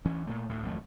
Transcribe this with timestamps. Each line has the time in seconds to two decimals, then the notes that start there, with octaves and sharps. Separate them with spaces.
0.05 D2 E3 C#4
0.27 A#2 A3
0.49 D2 A2
0.63 G#1 F2 F#3 A3